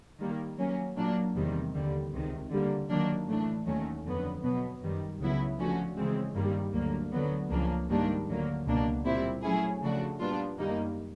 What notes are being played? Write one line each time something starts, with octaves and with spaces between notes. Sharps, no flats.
D#3 G3 A#3
F#3 A#3 C#4
A#2 F#3 A#3 D4
E2 C3 D#3 G3
D#2 D3 G3
C#2 C3 D#3
D3 G3 A#3
D#3 F#3 A#3 D4
A2 E3 A3 D4
D#2 D#3 F#3 A3 C#4
F2 D3 F#3 B3
B2 F#3 B3
F#2 D#3 G3
C#2 C#3 F#3 B3 E4
D3 F3 A3 C#4 F#4
C#3 E3 G#3 C4
G2 D#3 G3 A#3
D2 D3 F#3 A#3
D2 D3 F#3 B3
C#2 C#3 F3 A#3 D4
G#2 D#3 G3 A#3 D4
D2 D3 F#3 A#3
C#2 B2 F#3 A#3 D4
A#2 G3 C4 E4
F#3 A3 C#4 E4 G#4
C#3 F3 A3 D4 F#4
A#2 G3 B3 D4 F4
F#2 D#3 G3 A#3 D#4